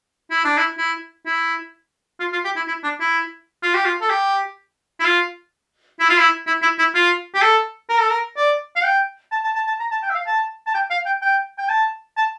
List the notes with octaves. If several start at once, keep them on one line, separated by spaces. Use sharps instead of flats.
E4
D4
E4
E4
E4
F4
F4
G4
E4
E4
D4
E4
F4
G4
F4
A4
G4
E4
F4
E4
F4
E4
E4
E4
E4
F4
G4
A4
A#4
A4
A#4
D5
F5
G5
A5
A5
A5
A5
A#5
A5
G5
E5
F5
A5
A5
G5
F5
G5
G5
G5
A5
A5